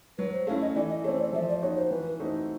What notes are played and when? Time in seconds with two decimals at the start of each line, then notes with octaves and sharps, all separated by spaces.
0.18 F#3 B4
0.32 C5
0.47 A3 C#4 E4 F5
0.61 D#5
0.76 E3 D5
0.90 D#5
1.04 A3 C4 C#5
1.19 D5
1.33 F3 E5
1.48 D5
1.61 A#3 D#4 F#4 C#5
1.77 C5
1.91 E3 B4
2.19 A3 C4 D#4 F#4